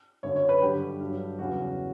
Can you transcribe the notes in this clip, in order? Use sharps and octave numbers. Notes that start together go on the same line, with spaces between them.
F#2 D3 F#3 C#5
C#5
B4
G2 D3 F#3 G4
G2 F#3
E2 C#3 F#3 F#4